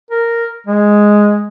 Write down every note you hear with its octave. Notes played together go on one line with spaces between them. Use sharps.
A#4
G#3